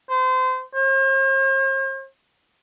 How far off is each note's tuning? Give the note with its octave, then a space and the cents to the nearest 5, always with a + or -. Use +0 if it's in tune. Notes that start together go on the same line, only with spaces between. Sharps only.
C5 -30
C5 +45